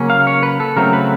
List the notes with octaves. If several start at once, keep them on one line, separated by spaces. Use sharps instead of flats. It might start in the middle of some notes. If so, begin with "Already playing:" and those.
Already playing: C#3 F#3 A#3 C#4
F5
C#5
B4
A4
C#3 F#3 A3 C4 A#4
B4